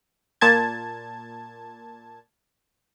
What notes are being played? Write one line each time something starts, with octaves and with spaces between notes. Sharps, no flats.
A#2 A5 G#6